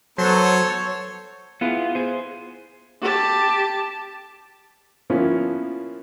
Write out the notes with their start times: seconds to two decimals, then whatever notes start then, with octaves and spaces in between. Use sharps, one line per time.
0.18 F#3 B3 A4 C5 C#5
1.61 B3 E4 F4 G#4
1.95 G#4 C5
3.01 G4 A5
5.10 F3 A#3 B3 C#4 E4 F4